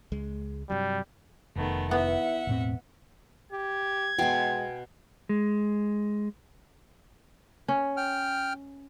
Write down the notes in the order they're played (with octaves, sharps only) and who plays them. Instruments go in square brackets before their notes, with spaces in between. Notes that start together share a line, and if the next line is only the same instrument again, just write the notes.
[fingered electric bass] C#2 G#3
[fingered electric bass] G2 C3 F#3 [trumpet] G3
[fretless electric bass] F1 [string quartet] D#3 A3 B3
[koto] B3 [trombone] E4 [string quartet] E5 F#5
[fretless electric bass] E1 A2 C4
[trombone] G4 [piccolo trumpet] G#6
[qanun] B2 F5 C6 [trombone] G#3 [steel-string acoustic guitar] G5 G#5
[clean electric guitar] G#3
[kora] C#4
[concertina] G5 F6